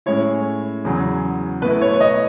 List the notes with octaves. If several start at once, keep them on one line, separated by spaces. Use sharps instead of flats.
A2 G#3 C#4 E4 C#5
E2 C#3 F#3
B2 A3 E4 B4
C#5
C#5
D#5